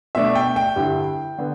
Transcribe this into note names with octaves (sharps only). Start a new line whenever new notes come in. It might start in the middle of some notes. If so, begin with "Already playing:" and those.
B2 A3 D4 E5
G5
G5
G2 D3 G3 E4
D3 B3